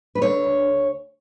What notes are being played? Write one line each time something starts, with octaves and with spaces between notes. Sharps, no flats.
B4
D3 C#5
D2